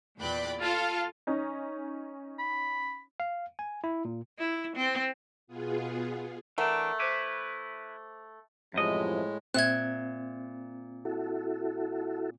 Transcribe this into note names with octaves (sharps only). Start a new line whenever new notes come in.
E2 A#2 D5 G5 B5 F#6
F4 A4 F5
C#4 D#4
B5
F5
G#5
E4
A#2
E4
C4
B2 B3 F4 G#4
E3 A3 D4 A#4 F#5 A#5
E4 B4 C5 D6
F#2 A2 C3 E3 F3 G#3 D#5
A#2 C4 E5 F#6 G#6
E4 F#4 A4